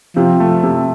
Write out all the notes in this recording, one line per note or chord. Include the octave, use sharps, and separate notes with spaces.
C3 F3
A3
C3